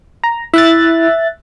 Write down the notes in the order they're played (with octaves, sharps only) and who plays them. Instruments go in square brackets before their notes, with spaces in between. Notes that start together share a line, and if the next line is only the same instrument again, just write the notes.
[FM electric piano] A#5
[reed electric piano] E4 [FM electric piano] E5 F#6 A6